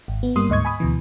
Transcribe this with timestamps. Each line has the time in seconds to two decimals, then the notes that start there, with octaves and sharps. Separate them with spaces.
0.08 G#1
0.23 B3
0.36 G2 G3 A#3 C6 D#6
0.49 D2 G#2 D#5 C#6 G#6
0.65 G#5 B5 D#6
0.80 D2 B2 E3